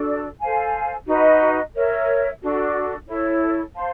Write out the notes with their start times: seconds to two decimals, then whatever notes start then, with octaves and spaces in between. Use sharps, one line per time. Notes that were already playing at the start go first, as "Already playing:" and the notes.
Already playing: D4 F#4 A4 D5
0.40 A4 C5 F5 G#5
1.07 D#4 F#4 B4 D#5
1.74 A#4 C#5 E5
2.41 D4 F#4 A4
3.08 E4 A4 C#5
3.74 C5 F5 A5 C6